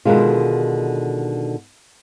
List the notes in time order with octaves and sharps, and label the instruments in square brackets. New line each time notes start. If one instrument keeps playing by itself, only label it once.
[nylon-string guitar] B2 D3 D#3 F3 G#3 F4